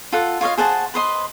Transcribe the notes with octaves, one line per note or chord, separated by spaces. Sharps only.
F4 A4 F#5
F4 C#5 D#5 F5
G#4 C5 F#5 A5
B4 C5 D#5 C6